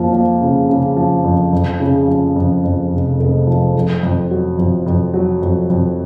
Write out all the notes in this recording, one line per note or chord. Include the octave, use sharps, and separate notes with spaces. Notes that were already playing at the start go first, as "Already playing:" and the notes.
Already playing: F2 F3 A#3
F3
C#3
C#3
F3
F2
F2
C#3
F3
F2
F2
F1
F1
F3
F2
F2
F#3
F2
F2
F#3
F2
F2